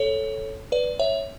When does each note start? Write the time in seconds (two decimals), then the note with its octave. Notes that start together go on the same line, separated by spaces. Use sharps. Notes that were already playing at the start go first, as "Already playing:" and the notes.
Already playing: A4 C#5
0.72 B4 D5
0.99 C#5 E5